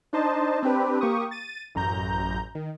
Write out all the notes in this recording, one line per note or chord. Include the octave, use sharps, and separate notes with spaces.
D4 D#4 C5 D#5 A5
C4 D4 G4 B4
A#3 G4 C#6 D#6
A6 D#7
A1 F#2 A#5 G6
D#3